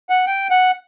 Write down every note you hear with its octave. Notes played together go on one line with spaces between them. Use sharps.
F#5
G5
F#5